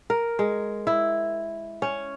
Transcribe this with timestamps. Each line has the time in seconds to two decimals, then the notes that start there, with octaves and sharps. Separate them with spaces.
0.10 A#4
0.39 G#3
0.87 E4
1.82 C#4